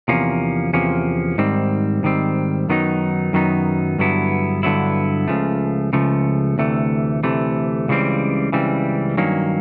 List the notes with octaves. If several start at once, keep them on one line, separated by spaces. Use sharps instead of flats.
E2 C3 F3 A#3 C#4
E2 C3 F3 A#3 C#4
G#2 D#3 G3 C4
G#2 D#3 G3 C4
F#2 D#3 F#3 B3 D#4
F#2 D#3 F#3 B3 D#4
G2 D3 F#3 B3 E4
G2 D3 F#3 B3 E4
C#2 C#3 F3 A3
C#2 C#3 F3 A3
D2 C3 E3 A3
D2 C3 E3 A3
C#2 C#3 E3 G3 C4
C#2 C#3 E3 G3 C4
G2 D#3 F#3 A#3 C#4